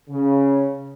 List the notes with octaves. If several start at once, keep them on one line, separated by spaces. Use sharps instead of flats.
C#3